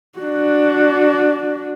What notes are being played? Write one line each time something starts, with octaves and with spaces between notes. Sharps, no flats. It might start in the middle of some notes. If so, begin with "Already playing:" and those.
D4 F#4